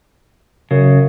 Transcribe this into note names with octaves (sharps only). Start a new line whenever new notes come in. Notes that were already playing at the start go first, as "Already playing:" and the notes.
F#2 C#3